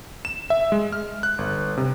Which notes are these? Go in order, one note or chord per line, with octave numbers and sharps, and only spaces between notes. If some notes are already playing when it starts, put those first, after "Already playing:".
E7
E5
G#3
F6
F#6
G1
C3